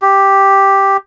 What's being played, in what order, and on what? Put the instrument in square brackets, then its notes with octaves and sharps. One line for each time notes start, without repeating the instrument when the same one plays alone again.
[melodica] G4